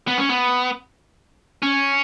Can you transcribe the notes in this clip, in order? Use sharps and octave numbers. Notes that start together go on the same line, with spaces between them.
B3
C#4
B3
C#4